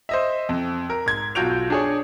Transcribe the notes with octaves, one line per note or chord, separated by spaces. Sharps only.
C5 D#5 E5
F2
A#4
G#2 G#6
B1 F4 F#4 G6 D7 F7
D4 G#4 C#5